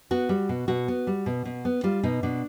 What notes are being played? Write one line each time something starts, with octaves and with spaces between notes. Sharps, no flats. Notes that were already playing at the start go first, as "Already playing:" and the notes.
B3 F#4
G3
B2
B2 F#4
B3
G3
B2
B2
B3
G3 F4
B2 D#4
B2 D4